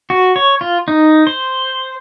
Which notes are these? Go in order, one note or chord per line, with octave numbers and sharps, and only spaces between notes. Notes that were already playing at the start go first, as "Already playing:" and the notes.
F#4
C#5
F4
D#4
C5